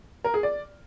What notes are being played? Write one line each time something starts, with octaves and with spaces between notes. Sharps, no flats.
A#4
G#4
D5